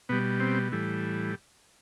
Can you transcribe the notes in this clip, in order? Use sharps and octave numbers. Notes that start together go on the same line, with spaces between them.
B2 G3 B3
C4
A2 E3 G3